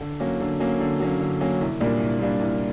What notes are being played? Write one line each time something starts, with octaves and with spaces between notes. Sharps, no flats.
D3
F#3 A#3 C#4
D3
F#3 A#3 C#4
D3
F#3 A#3 C#4
D3
F#3 A#3 C#4
C2
A#2 G3 A#3 D4
C2
A#2 G3 A#3 D4
C2